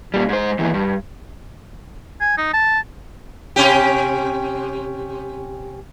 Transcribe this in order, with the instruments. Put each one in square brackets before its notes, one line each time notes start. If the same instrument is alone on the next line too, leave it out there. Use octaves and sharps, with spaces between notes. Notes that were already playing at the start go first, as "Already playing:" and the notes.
[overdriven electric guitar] A#2 G3
G#2 C5
D#2 E3
G2
[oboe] G#5
D#4
A5
[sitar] C3 C#4 G4